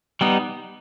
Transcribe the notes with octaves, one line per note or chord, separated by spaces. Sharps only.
G3 B3 D#4